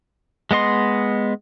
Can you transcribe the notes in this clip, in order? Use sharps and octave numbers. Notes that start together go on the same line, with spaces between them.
G#3 B3 D#5 C6